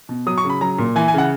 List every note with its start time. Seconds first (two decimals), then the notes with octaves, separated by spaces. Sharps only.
0.09 B2
0.27 F#3 D#6
0.38 C#6
0.44 C#3
0.50 B5
0.61 F#3 A#5
0.79 A#2
0.96 E3 G#5
1.08 G#5
1.14 C#3 F#5